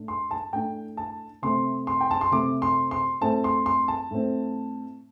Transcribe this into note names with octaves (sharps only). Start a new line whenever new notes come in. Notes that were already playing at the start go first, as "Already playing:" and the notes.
Already playing: A2 A3 D4
C6
A5
A2 A3 D4 G5
A5
C3 A3 C4 C6
C6
G5
A5
C6
C3 A3 C4 D6
C6
C6
A2 A3 C4 A5
C6
C6
A5
A2 A3 C4